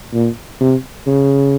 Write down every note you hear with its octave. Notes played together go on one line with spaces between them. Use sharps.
A#2
C3
C#3